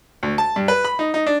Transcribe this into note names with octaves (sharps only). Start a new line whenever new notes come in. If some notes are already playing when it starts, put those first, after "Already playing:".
D2
A5
G2
B4
B5
D#4
D#4
D4